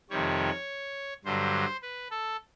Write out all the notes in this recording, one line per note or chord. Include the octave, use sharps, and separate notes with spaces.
F2 C3 D#3 G3 C#5
G2 D3 F#3 C5
B4
A4